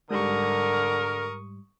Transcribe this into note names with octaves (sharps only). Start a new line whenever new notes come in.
G#2 D3 G3 A#4 C#6 D#6